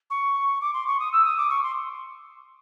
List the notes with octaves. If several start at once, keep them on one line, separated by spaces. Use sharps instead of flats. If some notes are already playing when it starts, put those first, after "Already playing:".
C#6
D6
C6
C#6
D#6
E6
D#6
D6
C#6
C6